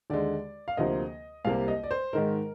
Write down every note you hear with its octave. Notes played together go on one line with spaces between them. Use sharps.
D#2 D3 G#3 D5
F5
D2 C3 F3 A#3 D#5
C2 C3 G3 A#3 F5
D#5
D5
C5
G#2 D#3 G#3 A#4